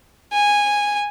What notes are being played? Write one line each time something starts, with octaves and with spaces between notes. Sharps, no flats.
G#5